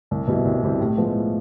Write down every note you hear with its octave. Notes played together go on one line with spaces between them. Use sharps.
C2
B2 G3 C4 E4
C2
B2 G3 C4 E4
A2
F3 G#3 B3 E4
A2